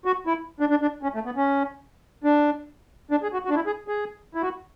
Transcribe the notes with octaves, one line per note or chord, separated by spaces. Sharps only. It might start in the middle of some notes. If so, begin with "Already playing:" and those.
F#4
E4
D4
D4
D4
C#4
A3
B3
C#4
D4
D4
G#4
F#4
F#4
D4
E4
G#4
G#4
E4
F#4